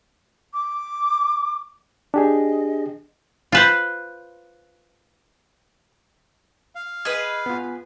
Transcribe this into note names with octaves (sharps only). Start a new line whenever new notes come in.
D6
D4 G4 G#4 D#5
F4 B4 C5
F5
G#4 B4 D#5 G#6
B3 F4